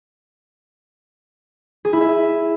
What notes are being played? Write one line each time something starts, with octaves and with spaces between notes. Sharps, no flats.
G#4
E4
E5